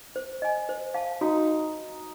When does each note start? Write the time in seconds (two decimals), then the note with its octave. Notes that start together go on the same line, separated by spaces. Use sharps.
0.16 C5
0.42 D#5 G#5
0.69 C5
0.94 F5 A5
1.21 D#4 F#4